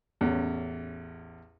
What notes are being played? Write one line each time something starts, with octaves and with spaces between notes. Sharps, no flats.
A1 E2 C#4